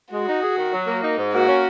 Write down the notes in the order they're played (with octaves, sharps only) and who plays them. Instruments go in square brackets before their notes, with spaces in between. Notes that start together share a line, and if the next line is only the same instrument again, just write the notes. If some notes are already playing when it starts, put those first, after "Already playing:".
[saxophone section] G#3 [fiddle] F#4
[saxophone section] D#4
G#4
D#3
F#3
A#3
D#4
G#2
[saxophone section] A#3 [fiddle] F#4
[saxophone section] C#4